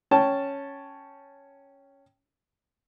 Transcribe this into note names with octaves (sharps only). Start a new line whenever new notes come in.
C#4 G5 A5